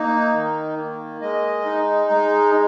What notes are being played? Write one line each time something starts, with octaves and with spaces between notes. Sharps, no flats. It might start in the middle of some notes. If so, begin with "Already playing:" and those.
Already playing: A#3 D#4
D#3
A#3
G#3 D#5
D#4
G#3